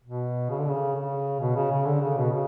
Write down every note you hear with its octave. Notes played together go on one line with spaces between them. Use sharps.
B2
C#3
D3
C#3
C#3
B2
C#3
C#3
D3
C#3
B2
C#3